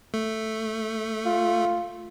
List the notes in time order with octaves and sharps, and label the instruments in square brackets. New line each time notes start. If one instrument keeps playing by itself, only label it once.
[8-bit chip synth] A3
[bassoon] F4